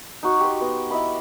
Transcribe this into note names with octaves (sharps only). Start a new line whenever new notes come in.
D#4 F#4 C#5
G4 C5
B3 D#5
E4 D#5 B5